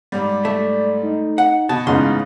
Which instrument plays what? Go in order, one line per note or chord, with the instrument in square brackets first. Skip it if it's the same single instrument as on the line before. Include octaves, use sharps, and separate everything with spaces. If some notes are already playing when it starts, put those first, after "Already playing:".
[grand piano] G#2 G3 [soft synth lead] D5
[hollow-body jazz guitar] A3
[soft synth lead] D#4
[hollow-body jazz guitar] F#5
[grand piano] B2 [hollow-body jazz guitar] A5 [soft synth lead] C#6
[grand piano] A1 G#2 [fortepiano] C#3 B3 D#4 [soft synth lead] F5 [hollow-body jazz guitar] C6